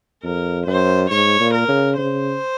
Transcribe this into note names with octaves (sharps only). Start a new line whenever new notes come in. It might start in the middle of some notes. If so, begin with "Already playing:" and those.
F2 A#4
F#2 C5
G#2 C#5
A#2
A#4
C#3
C#3 C5